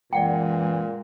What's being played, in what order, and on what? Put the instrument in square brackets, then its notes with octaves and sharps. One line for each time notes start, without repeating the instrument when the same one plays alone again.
[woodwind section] F#2 E3 [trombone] A#2 [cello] G#3 [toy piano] D5 F#5 G5